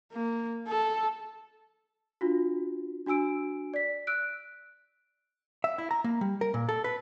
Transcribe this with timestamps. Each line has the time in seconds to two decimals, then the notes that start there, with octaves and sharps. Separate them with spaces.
0.13 A#3
0.69 A4
2.21 D4 F4 F#4
3.06 D4 F#4 G#5 E6 D7
3.74 D5 B6
4.07 E6 F#6 D7
5.64 E5
5.78 E4
5.91 A#5
6.04 A#3
6.21 G3
6.41 A#4
6.54 A#2
6.69 A4
6.84 B4